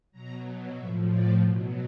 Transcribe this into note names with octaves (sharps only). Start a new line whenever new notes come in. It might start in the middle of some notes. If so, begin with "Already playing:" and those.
B2 F#3 A#5
A2 F3 E5
D5
B2 F#3